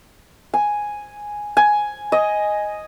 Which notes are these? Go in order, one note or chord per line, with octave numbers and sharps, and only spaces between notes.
G#5
G#5
D#5